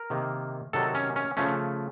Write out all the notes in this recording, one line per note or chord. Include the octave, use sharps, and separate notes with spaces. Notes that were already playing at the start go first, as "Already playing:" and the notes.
Already playing: A#4
C3 D#3 A#3
C3 D#3 F#3 A4
C#4
C#4
C#3 F3 A3 C#4